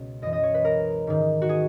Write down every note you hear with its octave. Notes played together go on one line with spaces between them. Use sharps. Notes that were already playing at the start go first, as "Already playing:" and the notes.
Already playing: C#2 B2
F#2 E3 D#5
D#5
C#5
B4
A#4
G#2 D#3
F#4
G#4